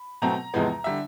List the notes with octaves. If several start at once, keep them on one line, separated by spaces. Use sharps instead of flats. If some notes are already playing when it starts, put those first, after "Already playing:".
Already playing: B5
B2 F#3 A3 C4 A#5
E2 C3 F3 G#3 B3
D3 G3 E5